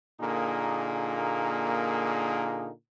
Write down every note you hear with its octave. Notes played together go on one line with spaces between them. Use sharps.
A#2 D3 A#3 D#4 G#4